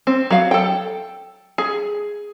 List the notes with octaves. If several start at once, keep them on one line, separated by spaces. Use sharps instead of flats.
C4
F#3 F5
A4 G5
G#4